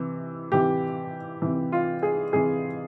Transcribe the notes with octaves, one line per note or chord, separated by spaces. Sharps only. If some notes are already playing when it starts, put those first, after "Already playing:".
Already playing: C3 E3
C3 E3 G4
C3 E3
F4
G#4
C3 E3 G#4